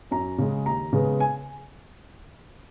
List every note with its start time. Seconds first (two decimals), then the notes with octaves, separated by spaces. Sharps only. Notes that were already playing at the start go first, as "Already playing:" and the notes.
0.11 F#2 A#5
0.38 C#3 G#3
0.66 D#2 A#5
0.93 C#3 G#3 B3
1.20 G#5